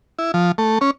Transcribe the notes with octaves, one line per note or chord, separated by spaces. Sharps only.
E4
F3
A3
C#4